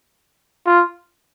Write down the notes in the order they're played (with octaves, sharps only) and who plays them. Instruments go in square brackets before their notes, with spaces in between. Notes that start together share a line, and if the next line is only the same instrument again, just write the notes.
[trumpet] F4